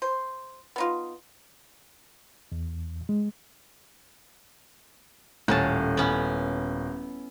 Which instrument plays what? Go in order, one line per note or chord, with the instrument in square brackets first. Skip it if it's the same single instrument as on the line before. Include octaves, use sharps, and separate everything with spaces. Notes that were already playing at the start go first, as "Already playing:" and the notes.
[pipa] C5
B3 D#4 F4
[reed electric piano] E2
G#3
[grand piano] D#1 [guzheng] A2 C#4 A5
[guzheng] B3 C#4 E4